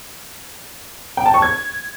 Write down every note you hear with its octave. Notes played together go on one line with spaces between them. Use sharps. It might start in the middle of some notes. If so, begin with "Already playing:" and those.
G5
A5
C#6
G#6